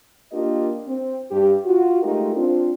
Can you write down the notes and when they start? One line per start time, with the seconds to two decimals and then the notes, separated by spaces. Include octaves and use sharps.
0.32 A#3 D4 F4 G4 A#4 D#5
0.87 C4
1.31 G2 G4
1.64 F4 F#4
2.02 G#3 A3 D#4 F4 G4 A#4
2.35 C4 D4 F4